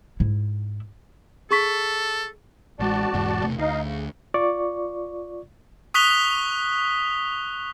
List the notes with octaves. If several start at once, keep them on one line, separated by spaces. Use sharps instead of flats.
G#2 E4
G#4 A4 C#6 B6
A1 G#3 F#4 D5 A5
E1 E2 G#2
E1 C3 A3
D2 D#4 D#5 F5
C#3
F4 D5 C#6
C#6 D#6 F#6 B6 F7 G7